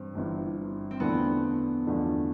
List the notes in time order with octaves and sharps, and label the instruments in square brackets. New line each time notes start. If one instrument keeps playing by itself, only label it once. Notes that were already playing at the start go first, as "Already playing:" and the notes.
Already playing: [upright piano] G2 E3 [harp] C4
[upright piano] G1 G2 E3
[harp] C4
[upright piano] E2 D3 F3 A3 D4 [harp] B3
[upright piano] E2 D3 F3 A3 D4